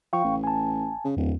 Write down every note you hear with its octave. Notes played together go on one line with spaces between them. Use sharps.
F3 F5 G5 C#6
A1
G#5 A5
C#3
D1 E2